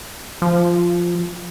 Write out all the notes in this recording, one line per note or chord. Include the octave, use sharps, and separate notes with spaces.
F3